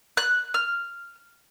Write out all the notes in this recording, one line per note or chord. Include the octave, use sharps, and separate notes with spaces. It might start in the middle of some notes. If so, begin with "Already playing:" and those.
F#6
F6